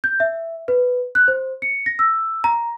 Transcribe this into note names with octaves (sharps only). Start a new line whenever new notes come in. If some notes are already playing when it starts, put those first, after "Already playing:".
G6
E5
B4
F#6
C5
C#7
A#6
E6
A#5